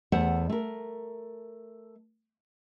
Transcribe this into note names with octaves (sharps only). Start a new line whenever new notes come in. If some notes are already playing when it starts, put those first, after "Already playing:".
E2 A3 C5 F#5
A3 A#4